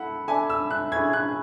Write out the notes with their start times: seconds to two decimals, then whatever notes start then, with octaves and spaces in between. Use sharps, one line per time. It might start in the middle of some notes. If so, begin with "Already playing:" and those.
Already playing: E4 A4 E5 F#5
0.28 D4 A4 E5 G#5
0.50 E6
0.70 F#6
0.92 C#4 E4 G#4 G#6
1.13 F#6